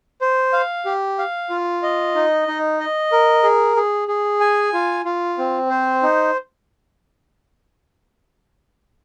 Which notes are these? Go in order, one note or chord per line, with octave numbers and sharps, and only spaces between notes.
C5
F5
G4
F5
F4
D#5
D#4
D#4
D#5
A#4
G#4
G#4
G#4
G#5
F4
F4
C4
C5
D#4